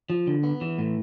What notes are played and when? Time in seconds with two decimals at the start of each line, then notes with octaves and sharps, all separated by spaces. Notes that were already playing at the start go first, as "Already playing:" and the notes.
0.10 F3
0.27 D3
0.43 B3
0.61 E3
0.78 A2